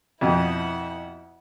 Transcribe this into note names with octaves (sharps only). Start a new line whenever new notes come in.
F2 B2 E4 F#5